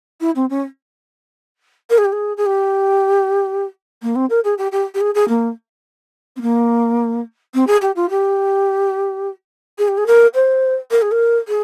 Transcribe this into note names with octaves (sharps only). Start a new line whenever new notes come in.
E4
C4
C#4
A#4
G#4
G4
G#4
G#4
G4
A#3
C4
A#4
G#4
G4
G4
G4
G#4
G#4
A#3
C4
A#3
C4
G#4
G4
F4
G4
G#4
G4
G#4
A#4
C5
A#4
G#4
A#4
G#4